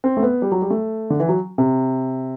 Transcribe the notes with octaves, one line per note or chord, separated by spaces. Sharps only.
C4
A3
B3
G3
F#3
G3
A3
D3
E3
F#3
C3